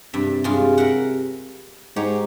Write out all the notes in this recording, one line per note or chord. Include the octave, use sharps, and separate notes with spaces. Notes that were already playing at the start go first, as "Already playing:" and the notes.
G2 C3 E5
G2 G#3 F4
A#4 E5 F#5
G#2 G4 C#5